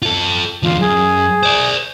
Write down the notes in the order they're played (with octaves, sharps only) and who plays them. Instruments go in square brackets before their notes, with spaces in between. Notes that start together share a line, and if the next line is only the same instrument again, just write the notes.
[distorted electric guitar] F4 A4
[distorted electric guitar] E2 D3 [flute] F4
[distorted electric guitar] F#2 [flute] G#4
[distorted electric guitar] C5 D5